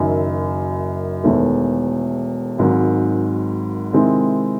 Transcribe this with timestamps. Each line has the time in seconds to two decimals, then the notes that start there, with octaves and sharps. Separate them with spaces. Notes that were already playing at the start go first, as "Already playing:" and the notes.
Already playing: F#1 F#2 D#3 F#3
1.23 E1 E2 D#3 A3
2.58 G#1 G#2 D#3 F#3
3.93 C3 D#3 G#3 C4 E4